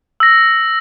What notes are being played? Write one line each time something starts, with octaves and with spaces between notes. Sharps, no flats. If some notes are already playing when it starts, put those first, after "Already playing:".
E6 A#6